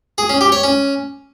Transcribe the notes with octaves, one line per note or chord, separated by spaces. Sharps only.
G#4
C#4
G4
C#5
C#4